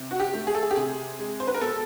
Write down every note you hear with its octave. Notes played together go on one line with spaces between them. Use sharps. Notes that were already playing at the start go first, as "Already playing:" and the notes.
Already playing: C3
F#4
G4
A3
G#4
A4
G#4
G4
C3 G#4
G#3
C5
B4
A#4
B2 A4